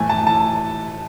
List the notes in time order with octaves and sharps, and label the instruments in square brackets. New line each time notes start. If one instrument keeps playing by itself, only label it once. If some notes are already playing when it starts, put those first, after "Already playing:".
Already playing: [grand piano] A2 E3 A3 G#5
A5
A5